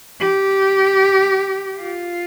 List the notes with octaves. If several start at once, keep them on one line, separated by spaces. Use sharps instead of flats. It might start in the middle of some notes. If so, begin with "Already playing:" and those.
G4
F4